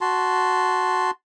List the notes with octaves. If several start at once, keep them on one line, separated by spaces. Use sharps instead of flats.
F#4 A5 C6